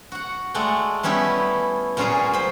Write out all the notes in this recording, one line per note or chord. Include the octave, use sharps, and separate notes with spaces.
F#4 F#5
G#3 A3 D5 F#5 G5
G3 B3 C#4 E4 G4
A#2 F#3 C#4 F4 G#4 A#5
C5 B5